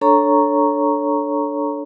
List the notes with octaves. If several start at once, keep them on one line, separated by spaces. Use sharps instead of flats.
D4 A4 C#5 A#5 C#6